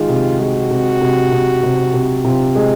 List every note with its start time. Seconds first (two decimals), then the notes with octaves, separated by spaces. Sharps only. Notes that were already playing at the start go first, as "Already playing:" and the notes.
Already playing: D#3 G#3 F4
0.09 C3
0.39 G#3 F#4
0.70 C3
1.01 C3
1.32 C3
1.63 C3
1.93 C3
2.24 C3 F4
2.55 G#3